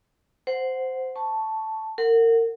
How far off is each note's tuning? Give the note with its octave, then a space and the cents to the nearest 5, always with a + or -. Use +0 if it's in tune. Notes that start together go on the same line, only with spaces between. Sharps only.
C5 -10 F#5 +0
A5 +0 C#6 +0
A#4 -30 F#5 +0